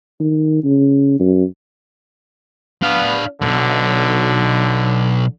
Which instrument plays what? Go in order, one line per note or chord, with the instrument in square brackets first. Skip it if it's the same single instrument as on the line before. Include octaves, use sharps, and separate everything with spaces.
[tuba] D#3
C#3
F#2
[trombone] B3 [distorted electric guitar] D4 F5
[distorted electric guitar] B1 G2 [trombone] D3